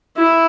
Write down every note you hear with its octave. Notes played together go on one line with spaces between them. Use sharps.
E4